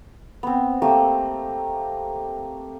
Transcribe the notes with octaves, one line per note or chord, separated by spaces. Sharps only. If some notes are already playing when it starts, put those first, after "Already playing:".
B3 C4
A3 A#3 G4